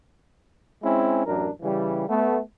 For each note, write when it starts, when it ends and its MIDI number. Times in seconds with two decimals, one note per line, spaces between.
0.83 1.25 56
0.83 1.25 60
0.83 1.25 61
0.83 1.25 64
1.26 1.50 33
1.26 1.50 42
1.26 1.50 62
1.26 1.50 70
1.62 2.07 49
1.62 2.07 52
1.62 2.07 55
2.09 2.40 57
2.09 2.40 59